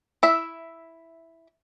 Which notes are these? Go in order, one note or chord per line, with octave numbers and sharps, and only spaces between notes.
E4 E5